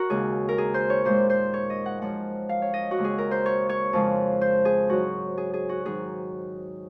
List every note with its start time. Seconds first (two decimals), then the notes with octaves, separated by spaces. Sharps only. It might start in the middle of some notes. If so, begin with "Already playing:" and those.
Already playing: F#4 A#4 C#5
0.10 D#2 C#3 G#3 G#4
0.49 A#4
0.58 G#4
0.74 C5
0.90 C#5
1.05 A#2 G#3 C5
1.30 C5
1.54 C#5
1.70 D#5
1.86 F#5
2.01 F#2 F3 G#3 F#5
2.49 F5
2.62 C#5
2.74 D#5
2.91 F#4
2.98 D#2 C#3 G#3
3.04 G#4
3.18 A#4
3.31 C5
3.46 C#5
3.69 C#5
3.93 F2 C#3 F3 G#3
4.41 C5
4.65 G#4
4.89 G#2 F#3 F#4
5.38 G#4
5.54 G#4
5.69 F#4
5.85 G#2 D#3 F#3 G#4